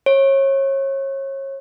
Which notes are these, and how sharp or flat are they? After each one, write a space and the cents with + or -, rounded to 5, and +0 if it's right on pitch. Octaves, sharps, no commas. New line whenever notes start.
C#5 -30